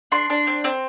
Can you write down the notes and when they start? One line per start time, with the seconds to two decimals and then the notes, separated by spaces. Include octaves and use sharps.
0.12 D4 C6
0.30 D4
0.47 C4
0.64 C4